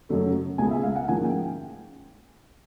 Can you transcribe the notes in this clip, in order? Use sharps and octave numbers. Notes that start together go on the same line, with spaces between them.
F#2 C#3 F#3 A3
C#2 B2 G#3 B3 G#5
E5
F5
F#5
G#2 F3 A#3 C#4 G#5
G5